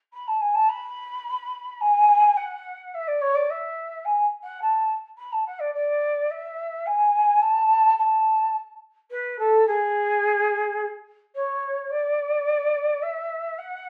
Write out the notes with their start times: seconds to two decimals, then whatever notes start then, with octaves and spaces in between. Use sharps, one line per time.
0.12 B5
0.27 A5
0.41 G#5
0.54 A5
0.69 B5
1.80 G#5
2.36 F#5
2.94 E5
3.07 D5
3.21 C#5
3.34 D5
3.50 E5
4.05 G#5
4.43 F#5
4.61 A5
5.17 B5
5.32 A5
5.46 F#5
5.59 D5
5.74 D5
6.30 E5
6.86 G#5
7.42 A5
7.98 A5
9.10 B4
9.38 A4
9.66 G#4
11.35 C#5
11.90 D5
13.02 E5
13.58 F#5